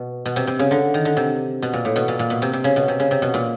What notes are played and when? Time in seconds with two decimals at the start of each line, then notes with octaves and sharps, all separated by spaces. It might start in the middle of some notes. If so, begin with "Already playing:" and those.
Already playing: B2
0.26 B2
0.36 C3
0.47 C3
0.59 C#3
0.71 D3
0.94 D#3
1.05 D3
1.17 C3
1.62 B2
1.73 A#2
1.85 A2
1.96 B2
2.08 A#2
2.19 A#2
2.30 B2
2.42 C3
2.53 C3
2.64 C#3
2.76 B2
2.88 C3
3.00 C#3
3.11 C3
3.22 B2
3.34 A#2